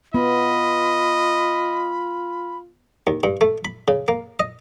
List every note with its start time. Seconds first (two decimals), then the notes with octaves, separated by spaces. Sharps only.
0.14 B3 F4 D#5 B5
3.07 D#2
3.23 G2
3.41 A3
3.65 B5
3.88 C#3
4.08 A#3
4.40 D#5